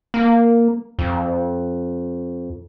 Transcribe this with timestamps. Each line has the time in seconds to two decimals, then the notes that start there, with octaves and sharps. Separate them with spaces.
0.14 A#3
0.99 F2